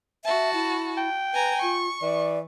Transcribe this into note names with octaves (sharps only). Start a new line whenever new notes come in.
F#4 E5 A5
E4
G5
B4 G#5 A#5
F4 C#6
E3 D5